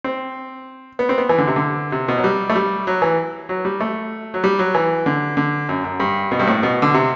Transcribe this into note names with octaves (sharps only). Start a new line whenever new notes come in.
C4
B3
C4
B3
E3
D3
C3
D3
C3
B2
F#3
G3
A3
G3
F#3
E3
F#3
G3
A3
F#3
G3
F#3
E3
D3
D3
F#2
F#2
G2
B2
G2
A2
B2
D3
C3